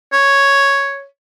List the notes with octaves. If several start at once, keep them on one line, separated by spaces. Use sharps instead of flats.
C#5